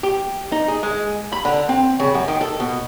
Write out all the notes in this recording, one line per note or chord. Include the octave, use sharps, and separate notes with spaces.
G4
D#4
G#4
G#3
B5
D3
C4
C#3
F#2
D#3
A4
B2